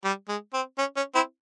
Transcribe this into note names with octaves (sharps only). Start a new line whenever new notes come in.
G3
G#3
C4
C#4
C#4
C4 E4